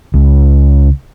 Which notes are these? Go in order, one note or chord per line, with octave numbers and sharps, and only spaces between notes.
C#2